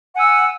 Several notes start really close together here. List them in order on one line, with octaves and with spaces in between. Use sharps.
F#5 G#5 E6